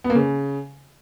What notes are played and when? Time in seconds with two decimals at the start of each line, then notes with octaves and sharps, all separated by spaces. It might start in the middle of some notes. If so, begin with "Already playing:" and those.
0.04 B3
0.10 A#3
0.15 C#3